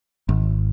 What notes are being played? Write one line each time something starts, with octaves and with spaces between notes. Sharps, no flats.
G#1